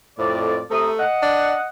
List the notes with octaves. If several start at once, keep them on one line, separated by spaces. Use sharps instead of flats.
F2 A2 D5
C3 A3 A#5 D#6
D#5 F#5
D4